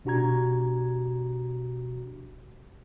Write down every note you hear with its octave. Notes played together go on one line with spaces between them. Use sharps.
B2 D4 F#4 G4 A#5 G#6